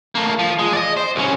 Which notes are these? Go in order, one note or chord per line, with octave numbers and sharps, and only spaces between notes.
A3 A#3
F3
G#3
D5 D#5
C5
C2 C#4